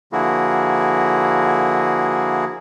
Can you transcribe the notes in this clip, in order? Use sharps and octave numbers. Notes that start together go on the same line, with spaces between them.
D3 F3 A#3 E4 F#4 G#4